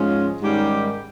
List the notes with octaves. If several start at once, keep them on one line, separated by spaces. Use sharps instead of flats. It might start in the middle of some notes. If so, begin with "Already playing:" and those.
Already playing: G#2 F3 G#3 C#4
G#2 D#3 G3 C#4 G4